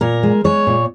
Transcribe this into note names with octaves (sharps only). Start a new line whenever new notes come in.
A#2 A#4
G#3
G#3 C#5
A#2